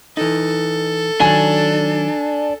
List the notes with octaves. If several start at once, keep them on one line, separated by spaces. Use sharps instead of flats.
E3 D#4 A4
D#3 F#3 D4 G#5